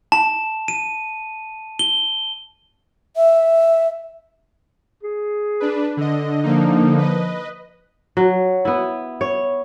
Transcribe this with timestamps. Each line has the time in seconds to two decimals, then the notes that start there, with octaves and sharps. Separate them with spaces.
0.12 A5
0.68 D#7
1.79 G7
3.16 E5
5.03 G#4
5.60 D4 B4
5.97 D3 D#5
6.43 D3 F3 A#3 D#4
6.98 B4 D#5
8.17 F#3
8.65 B3 E4
9.21 C#5